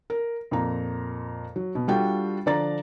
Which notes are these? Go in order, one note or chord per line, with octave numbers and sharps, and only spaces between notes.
A#4
F2 A#2 A#5
F#3
B2
G3 D4 F4 F#4 A4 G5
D3 F3 D5 A#5 A6